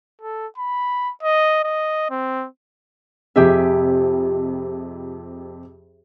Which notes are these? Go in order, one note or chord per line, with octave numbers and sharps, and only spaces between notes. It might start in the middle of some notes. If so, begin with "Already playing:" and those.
A4
B5
D#5
D#5
C4
F2 C3 G4 G#4 E5